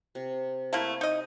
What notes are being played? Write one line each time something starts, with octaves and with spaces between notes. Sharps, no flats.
C3
A3 A#3 E4
D#4 D#5